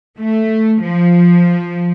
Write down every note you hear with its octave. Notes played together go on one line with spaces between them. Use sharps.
A3
F3